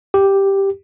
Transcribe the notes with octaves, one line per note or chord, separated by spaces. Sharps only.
G4